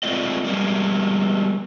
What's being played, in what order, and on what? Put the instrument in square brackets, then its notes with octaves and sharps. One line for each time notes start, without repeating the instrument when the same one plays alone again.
[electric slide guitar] G#3 A3 C4 F4 D5 D#5
G3 G#3 A#3